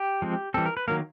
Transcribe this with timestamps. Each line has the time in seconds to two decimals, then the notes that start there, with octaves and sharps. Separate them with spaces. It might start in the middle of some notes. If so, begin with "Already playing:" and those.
Already playing: G4
0.22 F3 G#3 C4
0.54 E3 G3 C4 A4
0.66 A#4
0.77 B4
0.88 D#3 F#3 A#3 A#4